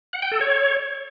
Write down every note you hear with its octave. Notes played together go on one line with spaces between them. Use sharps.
F#5
G5
A4
C#5